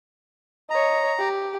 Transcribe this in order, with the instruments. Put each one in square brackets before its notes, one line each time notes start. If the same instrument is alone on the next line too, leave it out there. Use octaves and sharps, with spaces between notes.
[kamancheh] C#5 D#5 [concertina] A#5
[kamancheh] G4